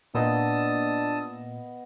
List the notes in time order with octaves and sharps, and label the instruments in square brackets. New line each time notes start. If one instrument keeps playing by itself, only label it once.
[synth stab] A#2 [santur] B3 D#5 [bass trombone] D4 [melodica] A5 D#6 E6